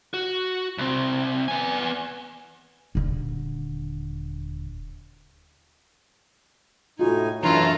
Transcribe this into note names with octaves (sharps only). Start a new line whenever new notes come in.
F#4
C2 C4
B3 G#5
D#1 D3
A2 D#4 F4 F#4 G#5
F#2 E3 A3 D4 F4 B4 C#5 A#5